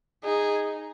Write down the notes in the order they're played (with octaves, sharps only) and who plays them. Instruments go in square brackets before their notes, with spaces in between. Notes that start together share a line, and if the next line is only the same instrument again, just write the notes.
[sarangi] D#4 [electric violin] G#4